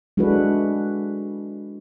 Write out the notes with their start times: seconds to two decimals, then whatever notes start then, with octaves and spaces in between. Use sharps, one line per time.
0.17 G#3 D4 E4 F#4 A4 B4